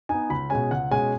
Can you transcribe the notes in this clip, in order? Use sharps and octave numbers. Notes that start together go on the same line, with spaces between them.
B3 D#4 G#5
C#2 B5
B2 G#3 C#4 G#5
C#2 F#5
B2 G#3 C#4 G#5